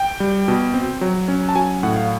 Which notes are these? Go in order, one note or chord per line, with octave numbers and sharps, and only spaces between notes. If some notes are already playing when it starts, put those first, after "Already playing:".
Already playing: G5
G3
B2
C4
F#3
C#4
A5
F#3 G#5
A2 F#5
F5